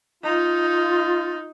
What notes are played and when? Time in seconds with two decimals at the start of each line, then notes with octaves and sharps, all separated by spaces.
0.23 D#4 F4